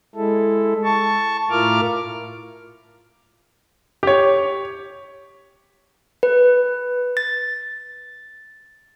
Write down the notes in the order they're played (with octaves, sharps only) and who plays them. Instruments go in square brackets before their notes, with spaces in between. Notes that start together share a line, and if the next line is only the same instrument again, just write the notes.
[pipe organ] G#3 E4 A4
A5 C#6
A2 E4 F4 A#4 D6 F6
[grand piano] G4 C#5
[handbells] B4
A6